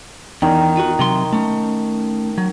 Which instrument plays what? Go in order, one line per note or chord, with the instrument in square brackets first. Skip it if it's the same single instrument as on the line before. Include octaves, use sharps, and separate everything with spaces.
[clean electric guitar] E2 [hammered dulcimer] D#3
[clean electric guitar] F4 F#4
C3 F#3 C6
A3 C#4
F#3